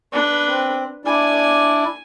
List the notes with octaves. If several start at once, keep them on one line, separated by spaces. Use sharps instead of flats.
D4 B4
C4
D4 E4 D5 G#5